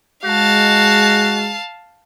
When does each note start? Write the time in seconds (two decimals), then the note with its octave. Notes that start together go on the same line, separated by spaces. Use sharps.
0.25 G#3 F#4 F5 A5